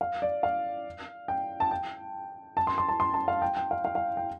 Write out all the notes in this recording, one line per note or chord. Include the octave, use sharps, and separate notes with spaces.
F5
D5
F5
G5
A5
G5
A5
C6
C6
A5
C6
A5
F5
G5
G5
F5
F5
F5
G5